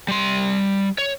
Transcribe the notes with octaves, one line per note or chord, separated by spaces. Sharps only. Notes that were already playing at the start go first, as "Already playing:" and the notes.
G3 C6
C#5